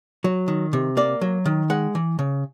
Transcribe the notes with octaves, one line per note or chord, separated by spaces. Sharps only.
F#3
D#3
C3
A#3 D5
F#3
D#3
G#3 F#5
E3
C#3